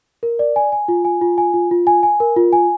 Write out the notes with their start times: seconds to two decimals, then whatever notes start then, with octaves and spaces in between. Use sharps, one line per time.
0.23 A#4
0.39 D5
0.56 G#5
0.72 G#5
0.88 F4
1.05 G#5
1.21 F4
1.38 G#5
1.54 F4
1.71 F4
1.87 G#5
2.03 G#5
2.20 A#4
2.36 F4
2.53 G#5